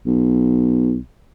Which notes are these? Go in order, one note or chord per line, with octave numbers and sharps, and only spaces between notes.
B1